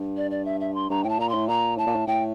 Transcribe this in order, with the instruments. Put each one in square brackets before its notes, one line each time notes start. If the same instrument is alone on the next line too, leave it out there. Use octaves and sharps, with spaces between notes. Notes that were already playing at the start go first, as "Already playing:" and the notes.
Already playing: [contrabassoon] G2
[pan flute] D5
D5
E5
E5
C6
[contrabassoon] G2 [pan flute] A#5
[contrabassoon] A2 [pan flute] G5
[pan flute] A5
[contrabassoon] A#2 [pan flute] A#5
[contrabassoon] A2 [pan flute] C6
[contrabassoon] A#2 [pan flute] A#5
[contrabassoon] A2 [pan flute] A5
[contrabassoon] A#2
A2
[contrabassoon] A2 [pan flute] G5